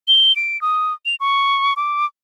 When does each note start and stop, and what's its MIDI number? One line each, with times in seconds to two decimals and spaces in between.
0.08 0.35 103
0.36 0.60 98
0.62 0.94 87
1.06 1.15 101
1.20 1.74 85
1.76 2.06 86